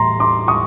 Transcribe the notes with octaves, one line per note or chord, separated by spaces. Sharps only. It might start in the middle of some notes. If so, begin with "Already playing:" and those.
Already playing: A2 E3 G3 A#5 C6
C6 D6
C#6 D#6